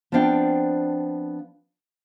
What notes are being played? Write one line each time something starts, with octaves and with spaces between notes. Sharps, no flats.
F3 B3 C4 D4 F5 G5